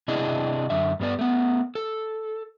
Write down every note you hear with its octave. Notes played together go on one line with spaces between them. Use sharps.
C3 D4 E4 G#4 D#5
F#2 D3 E5
G2 G3 B3 D5
A3 B3
A4